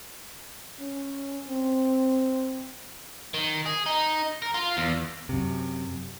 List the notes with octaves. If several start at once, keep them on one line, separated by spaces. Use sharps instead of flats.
C#4
C4
D#3
G#4
D#4
A#4
F4
E2
F#2 C3